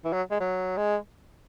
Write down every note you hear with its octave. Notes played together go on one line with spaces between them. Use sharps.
E3
F#3
G#3
F#3
G#3